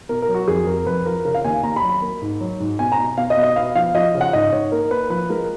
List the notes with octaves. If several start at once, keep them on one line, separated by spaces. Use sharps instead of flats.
B2 A#4
A#4
F#3
F#4
F2 G#4
F2 A#4
F2 B4
F3 A#4
C#3 A#4
F5
D#2 G#5
D#2 A#5
B5
F#3
B5
A#3
G#2
F#3
G#2
B2 G#5
A#5
B2
B2 F5
D#5
B2
D#5
B3 F5
F3 F5
F3 D#5
C#3
F#5
G#2 D#5
G#2 C#5
A#3 A#4
A#3 B4
F3 B4
G#3 A#4